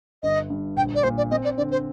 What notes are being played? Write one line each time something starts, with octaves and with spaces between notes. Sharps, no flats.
G1 D#5
G2
A#1 G5
D5
A#2 C5
D5
C4 D#5
D5
D3 D5
C5